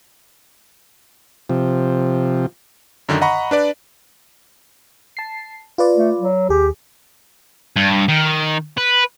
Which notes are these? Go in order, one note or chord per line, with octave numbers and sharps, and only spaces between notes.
C3 F3
F#2 D3 D#3
D#5 F#5 A#5 B5 C#6
D4 B4 D5
A5 C7
F4 B4 D5
A3
F#3
D#2 G4 G#4
G2
D#3
B4